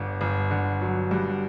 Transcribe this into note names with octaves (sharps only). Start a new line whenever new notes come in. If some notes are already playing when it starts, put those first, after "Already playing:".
Already playing: G1 D3
G1
D3
F#3
G2